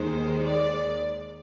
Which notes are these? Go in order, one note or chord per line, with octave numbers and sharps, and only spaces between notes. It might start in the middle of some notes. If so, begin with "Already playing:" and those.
Already playing: D#2 D#3 G#3 C5
D5